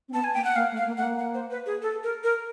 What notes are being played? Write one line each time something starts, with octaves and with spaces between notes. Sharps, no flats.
C4
B3 A5
G#5
A#3 G5
F#5
A#3 F5
A3
F5
A#3
A3 F#5
A#3
F#5
C5
B4
G#4
A4
A#4
A#4